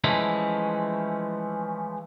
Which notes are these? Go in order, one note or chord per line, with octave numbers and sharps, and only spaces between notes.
E3 F3 G#3 A3 C#4 E4